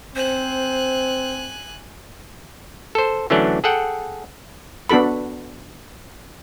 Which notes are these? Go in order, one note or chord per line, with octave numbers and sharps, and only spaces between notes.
C4 C5 G#5 F#6
A4 C5
D3 E3 F#3 A3 C#4 D4
G#4 A4 F#5 G5
B3 D4 F#4 A4 B5